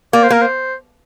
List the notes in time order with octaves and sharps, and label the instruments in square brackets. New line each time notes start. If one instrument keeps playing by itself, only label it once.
[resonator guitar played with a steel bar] A#3 [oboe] D5
[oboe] C5
[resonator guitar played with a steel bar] A#3 [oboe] A#4
[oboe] C5